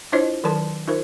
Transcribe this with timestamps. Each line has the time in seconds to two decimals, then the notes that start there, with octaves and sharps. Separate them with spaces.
0.12 D4 E4 F4 C5 C#5 D#5
0.44 D#3 F#3 A4 B4 A5 C6
0.88 D#4 F4 A#4 C5